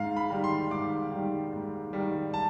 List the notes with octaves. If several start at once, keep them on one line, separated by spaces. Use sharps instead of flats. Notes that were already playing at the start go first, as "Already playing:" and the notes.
Already playing: G#2 F5
B5
D#3 G3
C6
G#2 D6
D#3 G3
G#2
D#3 G3
A5